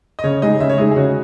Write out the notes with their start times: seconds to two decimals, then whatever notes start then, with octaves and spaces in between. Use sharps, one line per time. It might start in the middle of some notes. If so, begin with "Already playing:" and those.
0.19 D#5
0.24 C#3 C#5
0.42 G#3 D#4 G#4 D#5
0.60 C#3 E5
0.69 C#5
0.78 G#3 D#4 G#4 D#5
0.91 G#4
0.96 C#3 F#4